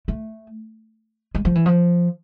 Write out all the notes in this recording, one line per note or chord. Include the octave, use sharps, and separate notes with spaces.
A3
G#3
F3
E3
F3